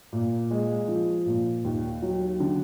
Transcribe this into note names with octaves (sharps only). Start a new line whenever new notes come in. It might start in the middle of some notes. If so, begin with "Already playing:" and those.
A#2
G#3
F3
A#2
D#2
F#3
D3